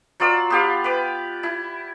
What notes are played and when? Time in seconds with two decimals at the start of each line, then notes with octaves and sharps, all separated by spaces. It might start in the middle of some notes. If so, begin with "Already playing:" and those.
0.20 F#3 F4 D5 E6
0.50 B3 G4 F5
0.84 B4 D6
1.43 E4